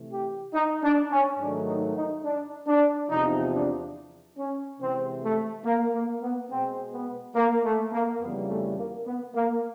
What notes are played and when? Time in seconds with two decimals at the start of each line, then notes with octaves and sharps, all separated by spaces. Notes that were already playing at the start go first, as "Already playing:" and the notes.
Already playing: C3 E3 A3
0.12 G4
0.54 D#4
0.83 D4
1.11 C#4
1.39 G#2 D#3 F#3 A3 D4
1.68 D#4
1.96 D#4
2.25 D4
2.67 D4
3.10 E2 C3 F3 D#4
3.52 D4
4.38 C#4
4.80 C3 E3 G#3 C4
5.22 A3
5.65 A#3
5.94 A#3
6.22 B3
6.50 B2 G#3 C4
6.93 B3
7.36 A#3
7.65 A3
7.93 A#3
8.20 F2 C#3 E3 G3 B3
8.49 A3
8.78 A#3
9.06 B3
9.35 A#3